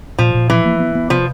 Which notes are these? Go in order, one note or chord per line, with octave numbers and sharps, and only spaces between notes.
A#2 F3
A#2
E3 F3
A#3
B3
B3
C3 F3